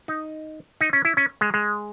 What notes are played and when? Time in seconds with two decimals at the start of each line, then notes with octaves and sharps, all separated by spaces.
0.08 D#4
0.81 D#4
0.93 C#4
1.05 E4
1.17 C#4
1.41 G#3
1.54 G#3